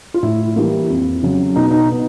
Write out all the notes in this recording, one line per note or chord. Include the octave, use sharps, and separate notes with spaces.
F4
A2 E4
E3 G3 A#3
F2
C#3 F#3
B2 D#4
D#4
B3 D#4